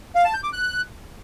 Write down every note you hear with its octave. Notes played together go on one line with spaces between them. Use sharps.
F5
A5
G6
D6
F#6